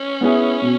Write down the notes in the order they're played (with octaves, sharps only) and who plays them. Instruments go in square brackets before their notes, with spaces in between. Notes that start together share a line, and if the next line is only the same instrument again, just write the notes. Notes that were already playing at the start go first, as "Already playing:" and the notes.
Already playing: [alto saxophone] C#4
[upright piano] B3 E4 G#4
B2